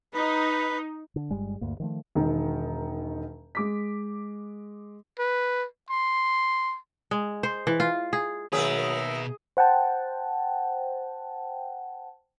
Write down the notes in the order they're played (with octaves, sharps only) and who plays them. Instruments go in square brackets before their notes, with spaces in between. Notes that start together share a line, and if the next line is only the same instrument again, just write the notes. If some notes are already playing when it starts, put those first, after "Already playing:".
[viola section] D#4 [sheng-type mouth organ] B4
[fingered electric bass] D3
G1 G2 G3 G#3
D2 G2 A#3
D#3 F3 A3
[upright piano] E1 D#3
G#3 D6 B6
[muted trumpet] B4
C6
[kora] G#3
C5
E3
F4
G#4
[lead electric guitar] B2 B4 [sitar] D#3 A#3 E5 [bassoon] F#3 [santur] G#4
[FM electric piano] C5 F#5 G5 A5